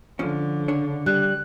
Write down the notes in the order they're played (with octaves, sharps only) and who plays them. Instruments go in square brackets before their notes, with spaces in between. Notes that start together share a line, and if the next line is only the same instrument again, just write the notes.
[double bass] D3 [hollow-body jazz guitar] F3 C#4
[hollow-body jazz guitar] C#3 D4 C#5
[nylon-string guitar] G3 [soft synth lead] F#6